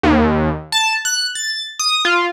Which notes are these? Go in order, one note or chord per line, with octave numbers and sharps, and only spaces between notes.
D#2
A5
F#6
A6
D#6
F4